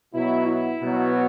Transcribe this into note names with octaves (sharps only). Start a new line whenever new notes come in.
B2 F#3 E4
E4
B2 F#3